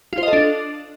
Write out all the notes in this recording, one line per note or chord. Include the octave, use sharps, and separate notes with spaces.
F4
C5
D#5
A4
D4